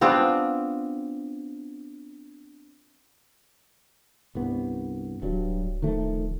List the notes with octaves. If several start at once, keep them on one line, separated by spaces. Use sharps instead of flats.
B3 C4 D4 F4
C2 G2 B3
D1 G2 F#3
D#3 F3 A3